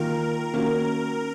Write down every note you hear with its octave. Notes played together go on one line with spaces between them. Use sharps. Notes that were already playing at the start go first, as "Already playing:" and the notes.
Already playing: D#3 A#3 F4 A#4
D#3 A#3 C#4 F#4